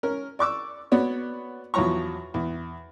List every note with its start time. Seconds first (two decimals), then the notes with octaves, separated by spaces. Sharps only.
0.03 C#4 A#4
0.39 D5 C#6 D6 E6
0.92 B3 F#4 C#5 D5
1.74 E2 F3 F#3 C#5 A#5 C#6
2.34 E2